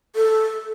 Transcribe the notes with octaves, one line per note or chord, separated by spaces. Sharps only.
A4